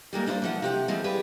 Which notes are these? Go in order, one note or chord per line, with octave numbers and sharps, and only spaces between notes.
G3 G#3 A#3 F4
D4 E4 F4 B4 C5 D5
E3 F3 F#5
C3 G4 F#5
E3 F3 G3 G#3 C4
G4 G#4 B4 D5